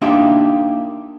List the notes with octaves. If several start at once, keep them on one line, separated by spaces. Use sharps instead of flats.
A#3 D4 D#4 F4 G4 E5